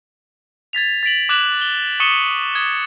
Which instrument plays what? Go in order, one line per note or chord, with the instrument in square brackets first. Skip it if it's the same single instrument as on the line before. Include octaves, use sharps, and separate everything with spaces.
[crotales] G#6 A6 B6 F7
A6 B6 D7 F#7
D6 F#6 G#6 E7 F#7
G7
C#6 D#6 C#7 D#7 E7 G7
D#6 G#6 G7